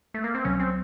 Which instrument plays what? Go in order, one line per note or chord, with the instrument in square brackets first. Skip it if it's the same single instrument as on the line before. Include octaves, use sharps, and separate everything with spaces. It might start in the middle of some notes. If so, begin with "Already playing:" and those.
[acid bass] A3
A#3
C4
[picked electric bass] C2 C3 F#3 [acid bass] C#4
[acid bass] C4